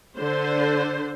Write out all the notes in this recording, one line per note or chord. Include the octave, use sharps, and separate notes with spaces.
D3 C5